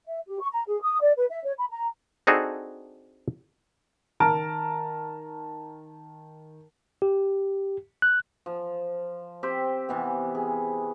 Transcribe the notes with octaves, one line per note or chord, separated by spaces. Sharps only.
E5
G4
C#6
A#5
G#4
D#6
D5
B4
E5
C#5
B5
A#5
C4 D4 D#4 F#4 G#4 A4
D#3 A5 A#5 F6 D7
G4
F#6
F3
C4 G4 C5
C3 E3 B3
G#4